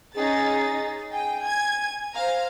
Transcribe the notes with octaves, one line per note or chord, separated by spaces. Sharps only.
C#4 D#4 G#4 A6
G5 G#5
G#6
C5 F5 A#5